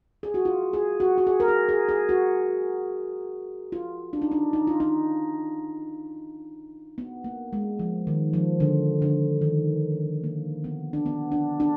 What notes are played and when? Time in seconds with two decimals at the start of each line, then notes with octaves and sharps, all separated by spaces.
0.23 G#4
0.34 F#4
0.45 F4
0.73 G#4
1.00 F#4
1.18 F#4
1.27 G#4
1.40 A#4
1.48 G#4
1.69 G#4
1.89 G#4
2.09 F#4
3.72 F4
4.13 D4
4.22 D#4
4.32 D4
4.53 D#4
4.67 F4
4.80 D#4
6.98 B3
7.24 A#3
7.53 G#3
7.79 F3
8.07 D#3
8.33 F3
8.60 D3
9.02 D3
9.42 D#3
10.24 A#3
10.64 B3
10.93 D4
11.06 B3
11.32 D4
11.60 D4